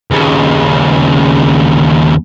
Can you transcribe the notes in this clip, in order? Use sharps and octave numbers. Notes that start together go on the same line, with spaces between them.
D#2 C#3